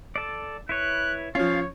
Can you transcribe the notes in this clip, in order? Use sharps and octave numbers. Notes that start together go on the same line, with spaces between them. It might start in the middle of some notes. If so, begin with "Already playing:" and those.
A4 D5
E4 B4 C#5 F#6
F3 C#4 F4 C#5 F5